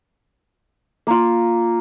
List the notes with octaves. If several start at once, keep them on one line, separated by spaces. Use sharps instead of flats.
A#3 F4